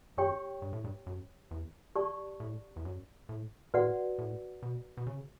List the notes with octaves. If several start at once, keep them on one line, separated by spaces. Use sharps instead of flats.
F#2 G4 C#5 G5 C#6
G2
A2
G2
F#2
E2
G4 D5 A5 C#6
A2
E2
F#2
A2
A2 F#4 B4 D5 F#5
A2
B2
B2
C#3